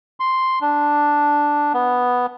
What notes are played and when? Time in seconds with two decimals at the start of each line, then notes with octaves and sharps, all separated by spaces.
0.20 C6
0.61 D4
1.74 B3